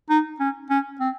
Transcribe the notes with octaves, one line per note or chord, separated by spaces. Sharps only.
D#4
C#4
C#4
C4